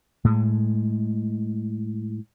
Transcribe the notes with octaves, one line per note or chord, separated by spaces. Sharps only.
A2 G#3